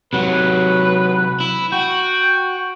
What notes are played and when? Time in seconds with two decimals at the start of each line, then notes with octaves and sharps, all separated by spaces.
0.13 C3 F#3 B4
1.40 E4
1.72 F#4 G5